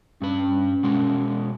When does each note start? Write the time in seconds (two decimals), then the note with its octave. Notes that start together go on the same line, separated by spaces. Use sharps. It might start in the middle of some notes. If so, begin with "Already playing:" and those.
0.22 G2 C#4 B4
0.83 B2 G#3 F#4